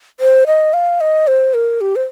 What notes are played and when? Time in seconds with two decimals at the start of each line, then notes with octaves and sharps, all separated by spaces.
0.20 C5
0.47 D#5
0.73 F5
1.01 D#5
1.27 C5
1.54 A#4
1.81 G4
1.96 C5